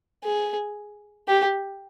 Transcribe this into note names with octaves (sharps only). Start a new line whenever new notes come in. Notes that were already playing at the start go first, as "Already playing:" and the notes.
G#4
G4